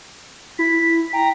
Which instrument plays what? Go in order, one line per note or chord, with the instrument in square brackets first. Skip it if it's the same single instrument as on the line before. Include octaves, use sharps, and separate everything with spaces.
[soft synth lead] E4 [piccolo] B6
[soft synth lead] G5 [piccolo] A#5